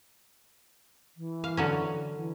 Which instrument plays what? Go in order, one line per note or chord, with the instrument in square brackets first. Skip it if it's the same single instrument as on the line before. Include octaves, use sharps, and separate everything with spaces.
[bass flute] E3
[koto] F5
D3 F#3 C#4
[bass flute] E3